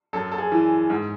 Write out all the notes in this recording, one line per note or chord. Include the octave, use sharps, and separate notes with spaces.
F#2 A4
A4
G#4
E3
G#2